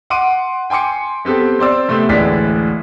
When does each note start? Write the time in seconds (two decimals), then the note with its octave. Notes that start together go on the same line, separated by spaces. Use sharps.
0.10 F#5 C6 D6 D7 D#7
0.70 G5 G#5 C6 D6 C#7
1.25 B3 C4 G4 A4
1.59 C4 C5 D5 E6
1.89 C3 A3 B3 C4
2.09 A1 D2 A2 G#3 D5 B6